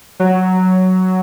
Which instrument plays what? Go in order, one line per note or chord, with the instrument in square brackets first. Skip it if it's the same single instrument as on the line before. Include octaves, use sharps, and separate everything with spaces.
[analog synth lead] F#3